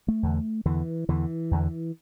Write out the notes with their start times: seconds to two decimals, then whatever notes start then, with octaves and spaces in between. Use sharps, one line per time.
0.08 A3
0.23 E2 D3
0.66 E2 D3 E3
1.09 E2 D3 E3
1.51 E2 D3